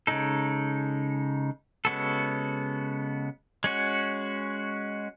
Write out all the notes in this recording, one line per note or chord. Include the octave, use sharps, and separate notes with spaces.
C#3 G#3 D#4 A4
C#3 G#3 B3 F#4 A4
G#3 C#4 F#4